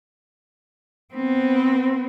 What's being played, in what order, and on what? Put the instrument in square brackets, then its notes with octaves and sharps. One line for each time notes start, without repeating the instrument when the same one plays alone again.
[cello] B3 C4